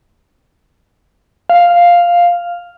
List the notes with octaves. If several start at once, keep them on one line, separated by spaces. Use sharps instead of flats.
F5